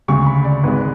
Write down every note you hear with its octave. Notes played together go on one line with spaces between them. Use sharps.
D2 C#3 G#3 C#6
B5
D5
G#1 G#2 G#3 B4